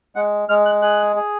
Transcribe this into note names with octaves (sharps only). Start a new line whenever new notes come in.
G#3 F#5
G#3 F6
F#6
G#4 F#6
G#4